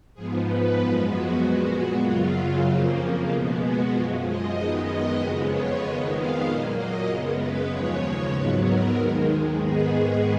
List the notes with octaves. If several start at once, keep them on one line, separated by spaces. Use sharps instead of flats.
G#2 F3 B3 G#4
B4
F#2 F3 G#3 B3
F#4
A#2 G#3 B3 F#4
F#2 C#3 F#3 F4
F2 C#3 F3 A#3 F#4
B2 G#3 B3
F#4
F#2 F3 G#3 F4
D#5
F#2 D#3 G#3 B3 D#5
D#5
F2 C#3 G#3 B3
C#5
F2 D#3 G#3 B3 D#5
F5
A#2 F#3 A#3 D#5
D#5
F#2 C#3 G#3 B3
B4
D#2 C#3 F3 G#3 C#5
G#2 F#3 B3 B4
A#4
D#2 D#3 G#3
G#2 D#3 G#3 B3 G#4